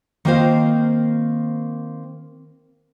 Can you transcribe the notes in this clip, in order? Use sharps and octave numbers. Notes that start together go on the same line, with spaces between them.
D#3 A#3 C4 F4 C5 F5